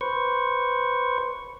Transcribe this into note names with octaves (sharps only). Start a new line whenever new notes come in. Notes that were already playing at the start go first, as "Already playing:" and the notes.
B4 C5 C#6